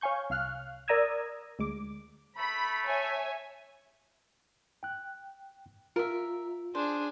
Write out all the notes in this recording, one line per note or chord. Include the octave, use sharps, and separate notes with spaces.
C#5 F5 G#5 C#6 G6
C2 F5 F6 F#6
A#4 D5 A#5 D#6 E6 G#6
D2 G#3 D6
A3 B5
C#5 E5 G#5
G5 F#6
F4 A#4 E5
D4 G#4 C5